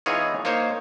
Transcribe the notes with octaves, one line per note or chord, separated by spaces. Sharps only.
E3 B3 D#4 F4 G#4 C#5
A#3 D#4 C5 C#5